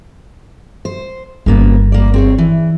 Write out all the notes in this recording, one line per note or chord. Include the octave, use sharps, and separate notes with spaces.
C5
G1 C#3 A#3 B3
A#3 D5
C4 G#4 C#5
E3